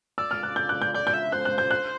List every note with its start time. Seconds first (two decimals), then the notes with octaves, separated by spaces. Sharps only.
0.18 D5 E6
0.31 F6
0.43 F#6
0.56 G6
0.69 F#6
0.82 G6
0.94 D5 G6
1.07 G6
1.14 E5
1.32 C5 F#6
1.45 F#6
1.58 G6
1.71 F#6